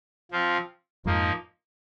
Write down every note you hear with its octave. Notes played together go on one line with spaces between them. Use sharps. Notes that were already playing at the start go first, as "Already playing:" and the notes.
F3 C4 F4
F2 G#2 F3 A#3 D#4